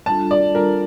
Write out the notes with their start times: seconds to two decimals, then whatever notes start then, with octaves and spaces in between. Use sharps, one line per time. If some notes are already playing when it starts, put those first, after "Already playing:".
0.06 G3 D4 F4 A4 A5
0.31 D5
0.55 G3 D4 F4 A4 A#4